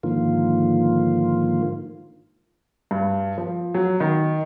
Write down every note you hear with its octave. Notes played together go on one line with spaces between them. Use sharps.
G#2 D3 D#3 F3 A#3 F4
G2
F3
F#3
D#3